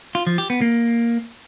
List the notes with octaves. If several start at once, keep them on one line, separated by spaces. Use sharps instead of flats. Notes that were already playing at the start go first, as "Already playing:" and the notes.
F4
F3
G4
B3
A#3